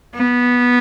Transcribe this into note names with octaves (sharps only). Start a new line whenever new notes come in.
B3